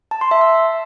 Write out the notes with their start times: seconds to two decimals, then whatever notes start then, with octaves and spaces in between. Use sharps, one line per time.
0.11 A5
0.21 C6
0.31 E5
0.41 E6